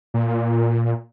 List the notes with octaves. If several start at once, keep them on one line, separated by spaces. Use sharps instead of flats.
A#2